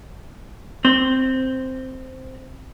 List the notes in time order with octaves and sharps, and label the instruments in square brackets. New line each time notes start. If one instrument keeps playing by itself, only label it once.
[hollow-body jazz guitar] C4 C5